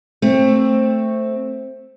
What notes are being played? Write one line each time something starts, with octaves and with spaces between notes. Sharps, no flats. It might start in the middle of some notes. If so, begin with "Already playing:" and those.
A3 C4